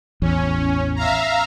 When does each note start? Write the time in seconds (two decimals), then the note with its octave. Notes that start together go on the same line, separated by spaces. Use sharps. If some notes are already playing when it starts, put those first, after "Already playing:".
0.22 A1 E2 C#4
0.96 E5 F5 A#5